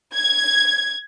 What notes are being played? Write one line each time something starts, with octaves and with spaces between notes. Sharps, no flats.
G#6